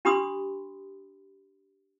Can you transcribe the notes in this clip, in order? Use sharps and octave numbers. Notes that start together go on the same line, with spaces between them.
D4 G4 B5 C6 D#6